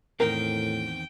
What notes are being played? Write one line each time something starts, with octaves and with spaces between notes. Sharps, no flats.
E2 A2 D#3 C4 A#4 G5